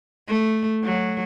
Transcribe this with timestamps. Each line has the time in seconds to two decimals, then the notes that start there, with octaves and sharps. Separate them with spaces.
0.28 A3
0.84 F#3